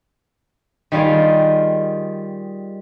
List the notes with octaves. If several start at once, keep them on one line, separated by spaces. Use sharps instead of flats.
D#3 G3 F4 G#4